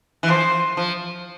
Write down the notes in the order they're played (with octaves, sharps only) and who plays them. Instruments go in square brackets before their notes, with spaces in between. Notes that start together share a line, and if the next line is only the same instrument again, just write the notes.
[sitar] E3
[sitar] F3 [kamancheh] C5
[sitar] F3